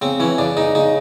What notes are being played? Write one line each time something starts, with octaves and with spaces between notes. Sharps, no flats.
C#3 C4
E3 C#4
C#3 D4
C#3 D#4
C#3 D#4